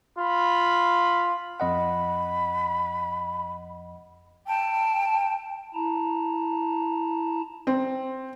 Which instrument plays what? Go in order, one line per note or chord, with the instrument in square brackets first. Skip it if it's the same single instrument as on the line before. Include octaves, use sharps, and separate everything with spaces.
[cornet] F4 [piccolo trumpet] B5
[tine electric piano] F2 D#5 F#5 [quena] B5
[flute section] G5 A5
[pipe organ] E4 A5 A#5
[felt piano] C4